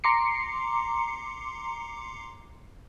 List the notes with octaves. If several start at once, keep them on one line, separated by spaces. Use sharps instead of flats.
A#5 C6 D6 C7 C#7